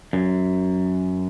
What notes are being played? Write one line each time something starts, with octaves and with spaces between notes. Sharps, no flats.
F#2